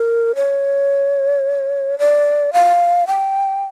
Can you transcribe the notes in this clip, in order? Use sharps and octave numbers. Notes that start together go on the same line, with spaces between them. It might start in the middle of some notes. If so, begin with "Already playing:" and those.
Already playing: A#4
C#5
D5
F5
G5